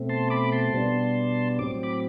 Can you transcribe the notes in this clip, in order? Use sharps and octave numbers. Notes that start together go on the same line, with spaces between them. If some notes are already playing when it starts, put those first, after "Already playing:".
Already playing: B2 A3 C4
A5 C6
B5 D6
A5 C6
B2 G3 B3 D4
A2 F#3 C4 D6
B5 D6